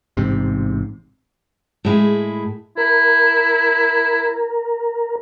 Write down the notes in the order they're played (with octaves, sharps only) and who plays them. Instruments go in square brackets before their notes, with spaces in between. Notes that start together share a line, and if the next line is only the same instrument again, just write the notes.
[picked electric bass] A1 G#2 C3
[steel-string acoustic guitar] A2 G#3 E4
[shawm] E4 [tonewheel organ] A#4